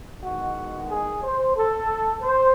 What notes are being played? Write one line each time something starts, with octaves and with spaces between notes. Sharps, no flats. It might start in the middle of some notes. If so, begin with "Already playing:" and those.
E2 D#3 G#3 F#4
G#4
C5
A4
C5